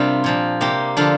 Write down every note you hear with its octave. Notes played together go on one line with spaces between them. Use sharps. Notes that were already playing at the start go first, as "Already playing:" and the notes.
Already playing: C3 G3 A#3 C4 D4 F4
A#2 F3 C4
C3 A#3 G4
D3 F3 D4 F4